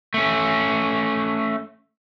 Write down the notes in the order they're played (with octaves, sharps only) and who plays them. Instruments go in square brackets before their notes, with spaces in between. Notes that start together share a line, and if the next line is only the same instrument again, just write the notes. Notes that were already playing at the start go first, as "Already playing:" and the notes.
[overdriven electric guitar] A3 C#4